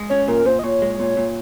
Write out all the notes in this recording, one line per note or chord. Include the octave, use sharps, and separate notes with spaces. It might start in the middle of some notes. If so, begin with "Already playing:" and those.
Already playing: G#3
C#4 C#5
A#2 A#4
A#2 C5
D#5
A#2 C#5
G#3
A#2
A#2